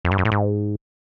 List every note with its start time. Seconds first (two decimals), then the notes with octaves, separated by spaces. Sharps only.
0.05 F2
0.11 G2
0.18 F#2
0.25 A2
0.32 G#2